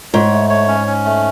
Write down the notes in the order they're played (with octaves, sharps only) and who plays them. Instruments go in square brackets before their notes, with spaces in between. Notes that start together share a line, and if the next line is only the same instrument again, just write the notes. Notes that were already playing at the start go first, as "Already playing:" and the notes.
[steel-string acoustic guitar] G#2 [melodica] C#5
[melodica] A3
C#5
C#4
C#4
A3